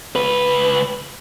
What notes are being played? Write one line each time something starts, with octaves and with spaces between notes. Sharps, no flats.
C#2 B4